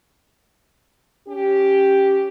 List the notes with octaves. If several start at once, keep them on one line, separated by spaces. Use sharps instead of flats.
C#4 G4